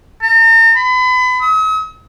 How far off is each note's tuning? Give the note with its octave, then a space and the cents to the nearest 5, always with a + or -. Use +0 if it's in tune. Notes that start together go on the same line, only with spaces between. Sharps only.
A#5 -45
B5 +35
D#6 +45